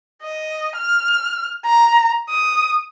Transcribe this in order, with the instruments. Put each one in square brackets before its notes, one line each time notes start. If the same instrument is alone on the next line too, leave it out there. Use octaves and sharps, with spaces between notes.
[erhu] D#5
F6
A#5
D#6